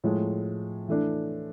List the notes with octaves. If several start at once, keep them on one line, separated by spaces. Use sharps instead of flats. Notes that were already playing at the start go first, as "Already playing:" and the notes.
A2 F3 G#3
E3 A3 D4